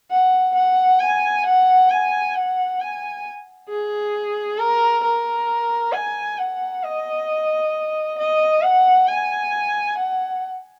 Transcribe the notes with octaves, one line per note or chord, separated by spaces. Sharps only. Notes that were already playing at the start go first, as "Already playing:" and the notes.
F#5
F#5
G#5
F#5
G#5
F#5
G#5
G#4
A#4
A#4
G#5
F#5
D#5
D#5
F#5
G#5
F#5